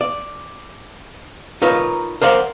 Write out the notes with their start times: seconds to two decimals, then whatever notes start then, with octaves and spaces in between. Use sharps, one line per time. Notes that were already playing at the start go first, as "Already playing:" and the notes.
0.01 D5
1.62 D#4 F4 A#4 B4 C#5
2.22 A#4 C5 D5 F5 F#5